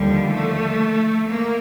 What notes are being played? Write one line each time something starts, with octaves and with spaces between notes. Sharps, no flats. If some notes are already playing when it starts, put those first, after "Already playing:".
Already playing: D#2 D3 F3 G3
A3
A#3